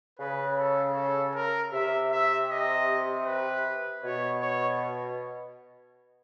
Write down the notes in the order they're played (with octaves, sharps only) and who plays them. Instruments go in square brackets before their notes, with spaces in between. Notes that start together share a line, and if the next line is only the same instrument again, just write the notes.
[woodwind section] C#3 [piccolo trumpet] B4
[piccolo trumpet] A4
A4
A#4
[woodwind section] C3 [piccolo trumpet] E5
[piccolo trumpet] E5
D#5
B4
[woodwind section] B2 [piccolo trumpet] C#5
[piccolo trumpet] C#5